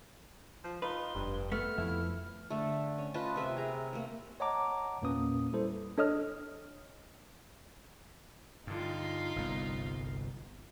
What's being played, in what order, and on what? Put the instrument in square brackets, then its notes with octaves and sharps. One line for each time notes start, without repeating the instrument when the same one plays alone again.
[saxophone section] F3
[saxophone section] D#4 F4 [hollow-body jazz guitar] B4 [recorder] C6
[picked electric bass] F1 [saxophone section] G2
[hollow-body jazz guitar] A3 B3 [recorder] F6
[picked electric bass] F2 F3 [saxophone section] E4
[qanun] D3 A3
C#4
F4 B4 D#5 A5
C3 A#4 B4 E5
G#4 A#5
A3 A#3
[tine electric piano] C#5 D#5 F#5 A5 A#5 D6
E2 A#2 A#3 C#4 B4 D#6
G3 E4 A4 C5
[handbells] D4 A4 C#5 D#5 D#6 F6
[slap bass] G2 D3 [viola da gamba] D#4 F4
[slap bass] G1 C2 B3